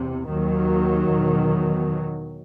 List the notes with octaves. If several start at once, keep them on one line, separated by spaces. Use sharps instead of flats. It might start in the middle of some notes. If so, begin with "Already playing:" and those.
Already playing: E2 C3
D#2 D#3 F#3
E2 B2